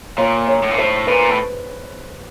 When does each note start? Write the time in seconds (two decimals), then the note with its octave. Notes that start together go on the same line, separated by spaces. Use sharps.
0.18 A#2 C#5
0.47 C#5
0.63 A2
0.71 A#2
0.78 A2 C5
1.07 A#2 B4
1.30 A2